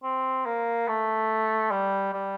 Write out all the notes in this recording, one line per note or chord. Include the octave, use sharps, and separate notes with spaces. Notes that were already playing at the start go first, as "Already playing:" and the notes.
C4
A#3
A3
G3
G3